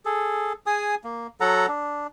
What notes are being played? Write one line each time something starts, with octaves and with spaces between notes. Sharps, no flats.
G#4 A4
G#4 G#5 D#6
A#3
F#3 A4 F#5 A#5
D4